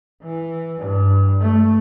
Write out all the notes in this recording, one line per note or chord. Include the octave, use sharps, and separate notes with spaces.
E3
G2
A3